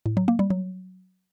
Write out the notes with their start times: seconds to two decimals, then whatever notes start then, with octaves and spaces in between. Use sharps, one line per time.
0.06 A2
0.17 F#3
0.28 A#3
0.39 G3
0.50 F#3